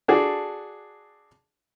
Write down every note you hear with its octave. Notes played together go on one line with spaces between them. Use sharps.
D4 F#4 G#4 A4